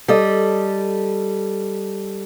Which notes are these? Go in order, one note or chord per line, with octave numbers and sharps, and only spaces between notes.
G3 A4 D#5